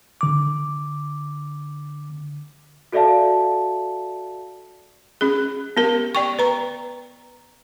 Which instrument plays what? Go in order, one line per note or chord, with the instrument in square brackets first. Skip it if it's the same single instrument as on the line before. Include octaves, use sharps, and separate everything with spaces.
[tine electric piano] D3 D6
[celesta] F#4 A4 D5 E5 F5 A5
[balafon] C#4 G#4
B3 G4 A#4
D5 G5 C#6
B4 A#5